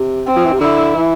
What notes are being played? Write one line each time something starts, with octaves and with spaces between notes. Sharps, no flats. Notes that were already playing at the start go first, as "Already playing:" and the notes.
Already playing: C3
C4
F3
E3
C3
D3 E4
E3